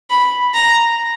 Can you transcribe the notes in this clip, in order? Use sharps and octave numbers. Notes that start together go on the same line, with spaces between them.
B5
A#5